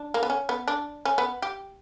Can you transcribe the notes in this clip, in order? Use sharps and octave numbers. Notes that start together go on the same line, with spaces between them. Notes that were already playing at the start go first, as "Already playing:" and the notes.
Already playing: D4
A#3
B3
C#4
B3
D4
C#4
B3
G4